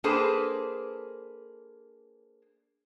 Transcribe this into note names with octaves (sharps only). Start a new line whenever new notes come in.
A#3 D4 G#4 A4 B4 C5